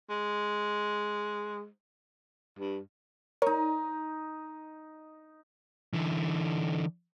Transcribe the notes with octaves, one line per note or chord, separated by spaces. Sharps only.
G#3
G2
D#4 A#4 C#5 D#5
D3 E3